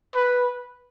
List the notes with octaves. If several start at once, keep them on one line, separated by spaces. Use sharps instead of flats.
B4